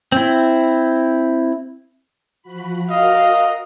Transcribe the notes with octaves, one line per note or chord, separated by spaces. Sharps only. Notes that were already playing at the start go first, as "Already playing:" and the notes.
C4 E4
F3 F#4 B5
F#4 A#4 D#5 F5 A#5